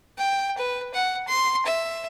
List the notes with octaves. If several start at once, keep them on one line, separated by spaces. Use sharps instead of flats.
G5
B4
F#5
C6
E5